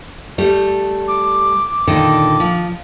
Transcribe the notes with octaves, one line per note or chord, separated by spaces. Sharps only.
G3 A3 G4
D6
A#2 D3 D#3
F3